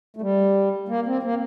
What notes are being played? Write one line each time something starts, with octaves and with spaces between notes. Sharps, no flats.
A3
G3
A#3
C4
A#3